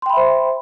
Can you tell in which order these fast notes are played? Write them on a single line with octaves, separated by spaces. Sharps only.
C6 G5 B5 E5 C5